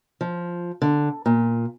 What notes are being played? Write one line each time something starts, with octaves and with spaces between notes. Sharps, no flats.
F3
D3
A#2